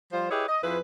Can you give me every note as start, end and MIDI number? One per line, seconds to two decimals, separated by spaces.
0.12 0.29 53
0.12 0.29 55
0.12 0.29 65
0.12 0.29 72
0.30 0.46 64
0.30 0.46 67
0.30 0.46 68
0.30 0.46 71
0.30 0.46 73
0.30 0.46 75
0.48 0.62 75
0.63 0.78 41
0.63 0.78 53
0.63 0.78 64
0.63 0.78 68
0.63 0.78 71